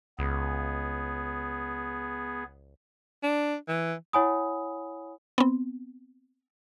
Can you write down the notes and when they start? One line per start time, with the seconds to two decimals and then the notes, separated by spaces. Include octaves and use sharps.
0.19 C#2 B3 G#4
3.23 D4
3.68 E3
4.13 E4 C#5 F#5 G#5 B5 D#6
5.38 B3 C4